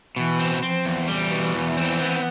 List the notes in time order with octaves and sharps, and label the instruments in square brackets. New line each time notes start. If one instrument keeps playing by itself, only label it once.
[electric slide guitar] B2 [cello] E3
[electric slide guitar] C4
[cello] F3 [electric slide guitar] C4
[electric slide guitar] E2
[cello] E3 [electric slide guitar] G3
[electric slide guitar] B2
E2
C4
B3